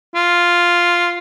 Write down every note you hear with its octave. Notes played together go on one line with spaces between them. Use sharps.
F4